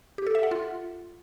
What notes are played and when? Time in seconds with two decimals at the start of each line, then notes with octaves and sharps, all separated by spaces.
0.18 G4
0.27 A4
0.35 E5
0.43 F#5
0.51 F4